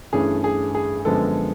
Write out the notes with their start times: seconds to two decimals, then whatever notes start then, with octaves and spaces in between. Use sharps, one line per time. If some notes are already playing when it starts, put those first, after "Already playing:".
0.12 G2 E3 A3 C#4 G#4
0.44 G#4
0.75 G#4
1.05 F#2 D3 F3 G#3 B3 A4